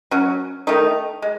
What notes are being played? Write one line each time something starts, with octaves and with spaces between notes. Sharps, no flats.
F#3 C#4
D#3 A3 D#4
G#3